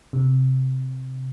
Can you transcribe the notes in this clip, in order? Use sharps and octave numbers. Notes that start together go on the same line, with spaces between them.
C3